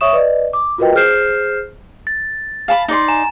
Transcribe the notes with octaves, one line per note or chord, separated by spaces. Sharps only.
C#5 E5 C#6 D#6 E7
B4 D5 D#5
D6
F4 F#4 A#4 B4 D#5 G5
G#4 C5 F6 G6 C7 E7
A6
F5 A5 B5
D#4 D5 C6
G#5 A#5 E7